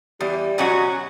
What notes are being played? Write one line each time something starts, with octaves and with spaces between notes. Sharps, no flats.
E2 G3
B2 F#3 C#4 F#4